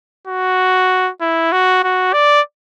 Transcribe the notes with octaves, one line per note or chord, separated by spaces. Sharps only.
F#4
E4
F#4
F#4
D5